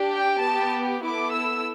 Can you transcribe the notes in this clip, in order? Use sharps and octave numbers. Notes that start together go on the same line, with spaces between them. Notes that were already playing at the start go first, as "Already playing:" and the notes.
Already playing: D4 G4
G5
B3 G4 A5
B3 E4 A4 D6
E6